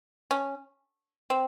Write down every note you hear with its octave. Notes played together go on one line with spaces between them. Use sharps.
C#4
C4